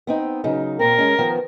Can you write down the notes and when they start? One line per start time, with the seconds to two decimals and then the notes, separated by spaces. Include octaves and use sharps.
0.07 B3 C4 D#4
0.44 C#3 F#3 D#4
0.79 A#2 C4 A#4
0.98 G#3 C#4
1.19 D#3 F3 B3